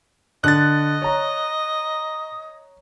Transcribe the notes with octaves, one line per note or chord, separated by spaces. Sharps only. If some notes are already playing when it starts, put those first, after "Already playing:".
D3 D4 D#5 F#6 A6
C#5 A#5